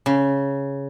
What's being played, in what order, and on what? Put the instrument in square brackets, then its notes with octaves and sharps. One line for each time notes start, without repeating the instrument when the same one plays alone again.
[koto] C#3